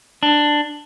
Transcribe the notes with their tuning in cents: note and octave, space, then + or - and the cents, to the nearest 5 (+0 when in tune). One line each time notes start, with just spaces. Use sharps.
D4 +10